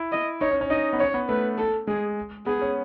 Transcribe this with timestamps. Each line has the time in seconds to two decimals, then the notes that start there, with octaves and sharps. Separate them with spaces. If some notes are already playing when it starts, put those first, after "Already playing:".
Already playing: E4
0.12 D#5
0.41 D#4 C#5
0.51 C#4
0.61 C#4
0.70 D#4 D#5
0.93 B3
0.99 C#4 C#5
1.14 B3
1.29 A3 B4
1.58 A4
1.87 G#3 G#4
2.46 B3 G#4
2.61 C#4